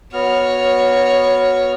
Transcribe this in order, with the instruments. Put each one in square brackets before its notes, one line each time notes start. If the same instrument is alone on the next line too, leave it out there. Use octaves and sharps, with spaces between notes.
[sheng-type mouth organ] B3 F#4 F6 [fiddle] C#5